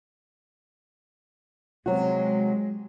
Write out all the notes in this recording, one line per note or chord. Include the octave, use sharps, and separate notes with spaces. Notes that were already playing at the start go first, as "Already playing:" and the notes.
C3 F#3 G#3 F#4